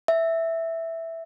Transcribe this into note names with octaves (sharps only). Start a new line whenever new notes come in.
E5